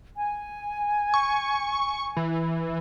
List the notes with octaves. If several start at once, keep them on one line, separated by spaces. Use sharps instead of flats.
G#5
C#6
E3